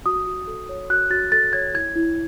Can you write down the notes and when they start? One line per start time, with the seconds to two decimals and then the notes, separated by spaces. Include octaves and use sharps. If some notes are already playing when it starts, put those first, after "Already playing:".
0.06 F#4 D#6
0.27 F#4
0.47 A4
0.69 C#5
0.90 F#4 F#6
1.10 F#4 A6
1.32 A4 A6
1.53 C#5 G#6
1.74 E4 G#6
1.95 E4